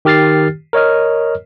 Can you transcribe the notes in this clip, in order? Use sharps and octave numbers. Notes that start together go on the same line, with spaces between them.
D#3 G4 F6 A6 C7
A#4 C#5 D#5 F6